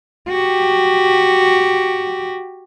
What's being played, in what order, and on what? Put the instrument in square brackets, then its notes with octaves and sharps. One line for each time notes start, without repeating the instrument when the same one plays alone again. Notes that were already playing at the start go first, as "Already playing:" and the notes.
[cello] F#4 G4